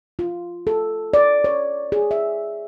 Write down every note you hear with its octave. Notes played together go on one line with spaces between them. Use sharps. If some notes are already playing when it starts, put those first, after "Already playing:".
F4
A4
D5
C#5
G#4
E5